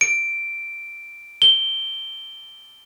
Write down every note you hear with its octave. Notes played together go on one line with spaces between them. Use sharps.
D7
G7